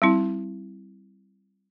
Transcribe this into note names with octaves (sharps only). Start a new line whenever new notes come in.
G3 C4 E4